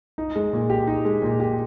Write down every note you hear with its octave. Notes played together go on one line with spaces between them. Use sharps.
D#4
G#3
A#2
G4
D#4
G#3
A#2
G4